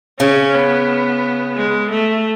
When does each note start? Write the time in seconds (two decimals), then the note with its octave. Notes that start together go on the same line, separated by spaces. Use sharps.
0.20 C#3 C#4
0.55 B3
1.56 G#3
1.91 A3